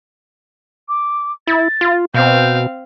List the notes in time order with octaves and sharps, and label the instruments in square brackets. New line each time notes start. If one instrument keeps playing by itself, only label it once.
[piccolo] D6
[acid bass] E4 [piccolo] A6
[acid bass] F4
[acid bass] B2 [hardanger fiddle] C4 F5 [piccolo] G6